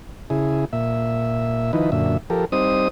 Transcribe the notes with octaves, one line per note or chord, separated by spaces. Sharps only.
C#3 E4 G#4
A#2 E5
D#3 F3 D#4 E4 B4
F#2 A#2 D3 E5
F3 G4 A4 A#4
G3 C4 D#4 C5 D#6